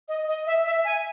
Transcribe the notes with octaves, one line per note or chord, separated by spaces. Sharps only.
D#5
D#5
E5
E5
G#5